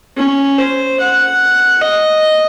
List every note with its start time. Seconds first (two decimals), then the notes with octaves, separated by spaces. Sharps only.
0.17 C#4
0.58 C5
1.00 F#5
1.81 D#5